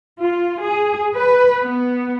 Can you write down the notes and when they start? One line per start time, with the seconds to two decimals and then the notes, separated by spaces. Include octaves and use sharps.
0.19 F4
0.62 G#4
1.15 B4
1.62 B3